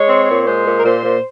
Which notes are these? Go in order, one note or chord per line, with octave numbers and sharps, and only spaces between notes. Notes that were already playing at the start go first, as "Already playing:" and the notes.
Already playing: G#3 C#5
C4
A#2
G#3 C5
A#2
A#4
A#2 C5
A#2